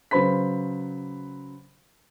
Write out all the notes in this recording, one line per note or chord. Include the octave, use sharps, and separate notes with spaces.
C#3 F#3 B4 C5 B5 B6